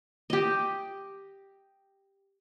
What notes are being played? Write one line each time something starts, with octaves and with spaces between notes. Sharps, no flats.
G4 D#5